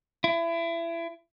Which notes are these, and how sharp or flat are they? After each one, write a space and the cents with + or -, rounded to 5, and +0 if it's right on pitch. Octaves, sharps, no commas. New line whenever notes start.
E4 +30